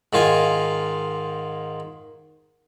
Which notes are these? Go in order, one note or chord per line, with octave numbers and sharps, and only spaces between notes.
G#2 D#3 F4 G#5